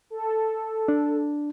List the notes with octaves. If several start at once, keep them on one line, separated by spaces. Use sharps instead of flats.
A4
D4